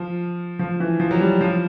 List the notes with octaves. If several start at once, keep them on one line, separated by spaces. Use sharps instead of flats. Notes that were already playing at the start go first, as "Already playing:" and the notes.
Already playing: F3
F3
E3
F3
F#3
G3
F3